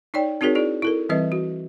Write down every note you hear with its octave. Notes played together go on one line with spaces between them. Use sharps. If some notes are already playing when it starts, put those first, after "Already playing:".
D#4 C#5 D5 G5
C4 D#4 F#4 G#4 A#4 C#5
E4 G#4 D5
E4 A4 A#4
E3 G3 C4 B4 D#5 E5
F#4